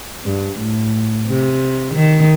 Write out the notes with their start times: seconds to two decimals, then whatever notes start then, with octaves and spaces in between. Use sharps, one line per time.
0.25 G2
0.59 A2
1.27 C3
1.94 D#3